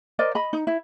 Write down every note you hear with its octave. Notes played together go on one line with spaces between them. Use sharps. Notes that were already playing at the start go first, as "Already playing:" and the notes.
A#4 C5 D5 D#5
D#5 B5
D#4
E4